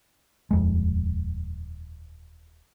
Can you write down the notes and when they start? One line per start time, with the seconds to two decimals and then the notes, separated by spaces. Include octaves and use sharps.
0.51 D#1 F2 G#3